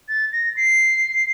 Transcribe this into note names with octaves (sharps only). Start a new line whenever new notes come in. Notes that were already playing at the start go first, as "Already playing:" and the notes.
A6
A#6
C7